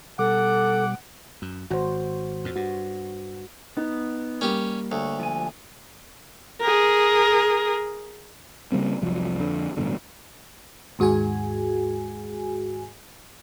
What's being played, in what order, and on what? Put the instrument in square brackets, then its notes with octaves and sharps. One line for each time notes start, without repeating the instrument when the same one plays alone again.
[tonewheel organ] B2 G3 D6 [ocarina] A4 [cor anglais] F#5
[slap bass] F#2
[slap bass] G#1 [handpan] F#4 C5
[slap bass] F2 A#2
[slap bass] G2 [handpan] F#4
[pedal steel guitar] B3 [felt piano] D#4
[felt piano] G3 A#3 [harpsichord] C#4 G4
[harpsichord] D2 [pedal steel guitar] C#5
[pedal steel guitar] F3 G#5
[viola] G#4 A#4
[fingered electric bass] C#3 G3 A#3 C4
C2 F2 F3 F#3
F2 D3
A1 G2 B2 D3
[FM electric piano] D#2 G#2 F#4 G#4 G#5